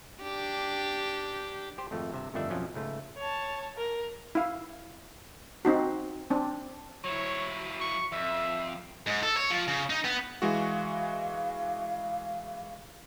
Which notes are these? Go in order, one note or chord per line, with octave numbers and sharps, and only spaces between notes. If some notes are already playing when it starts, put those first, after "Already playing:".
D4 G4
G4 C5
G#1 F2 A3
G2 C3 E5
G1 F2 D#3 A3 D4 E5
B1 F2 F3 F#3 C#4
C#2 G#2 A3
C#5 A5
A#4
E4 F5
C4 D#4 F#4
C4 D4
F#3 E4 C#5
C#6
F2 E5
G#2
A4
C#5
F3
C#3
D#4
B3
E3 G#3 F#4 F5